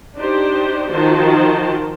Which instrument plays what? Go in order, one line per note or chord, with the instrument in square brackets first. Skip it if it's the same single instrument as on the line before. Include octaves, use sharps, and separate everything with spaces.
[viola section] D4 D#4 G4 C5 D5
D#3 F3 F#4 C5 A5